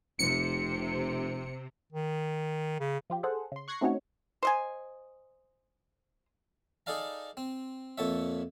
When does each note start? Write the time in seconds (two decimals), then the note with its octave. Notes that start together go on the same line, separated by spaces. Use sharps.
0.19 F1 C3 C#7
1.92 D#3
2.80 C#3
3.10 F3 F4 G4
3.23 G#4 A4 C5 F#5
3.52 C#3 C6
3.68 C#6 F#6 G#6 A#6 C7 C#7
3.81 A3 C4 C#4 D#4 F#4 C#5
4.43 C5 D#5 G#5
6.86 D#4 G#4 A4 D5 F5 A#5
7.37 C4
7.98 F2 A#2 A4 C#5 E5